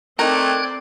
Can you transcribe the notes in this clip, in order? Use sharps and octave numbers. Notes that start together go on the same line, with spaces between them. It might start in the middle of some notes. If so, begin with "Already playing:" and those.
A3 C4 D#4 A#4 D5 G5 F#6 G#6